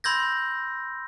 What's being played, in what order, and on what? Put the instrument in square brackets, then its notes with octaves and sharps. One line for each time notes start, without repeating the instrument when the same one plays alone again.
[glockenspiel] B5 C6 E6 G6 G#6 A#6